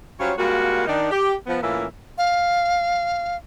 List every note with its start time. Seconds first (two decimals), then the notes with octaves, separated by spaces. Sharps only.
0.19 F#3 G3 C#4 F4 C5 C#5
0.38 G3 G#3 A#3 F4 F#4
0.87 D#3 D4 D#4
1.11 G4
1.47 F3 B3
1.62 A2 E3 A#3 C#4 F4 E5
2.18 F5